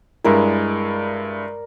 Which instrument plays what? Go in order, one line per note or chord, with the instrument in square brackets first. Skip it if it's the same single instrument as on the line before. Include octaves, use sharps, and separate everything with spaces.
[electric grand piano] G2 G#3 E4 [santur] A#4 D5